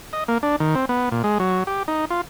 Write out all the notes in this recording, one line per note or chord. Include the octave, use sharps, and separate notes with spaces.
D#5
A#3
D4
D#3
C4
B3
A#2
G#3
F#3
G4
D#4
F4